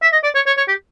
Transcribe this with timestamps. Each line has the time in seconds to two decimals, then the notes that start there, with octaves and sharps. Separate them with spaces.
0.02 E5
0.13 D#5
0.23 D5
0.35 C#5
0.46 C#5
0.57 C#5
0.68 G4